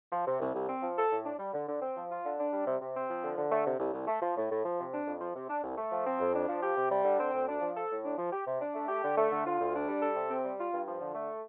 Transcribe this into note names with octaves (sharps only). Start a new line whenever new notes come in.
F3
C3
C2
C2
C4
F3
A4
A2
D4
G3
D3
D3
C4
F3
F4
D3
D4
G3
C3
C3
C4
F3
D3
D3
A3
C3
C2
C2
A3
F3
A2
A2
F3
C3
D4
F2
F3
C3
D4
C2
A3
F3
C4
F2
D4
F3
G4
C3
G3
D3
C4
D2
D4
F3
A4
A2
D4
F3
G4
C3
D4
A3
G4
D3
A3
D3
F4
D2
D4
G3
A4
C3
C4
G3
F4
G2
F3
D3
A3